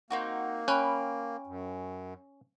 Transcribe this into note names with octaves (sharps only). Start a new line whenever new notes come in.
A#3 C4 D#4 F#4
C#4 G5 B5 F#6
F#2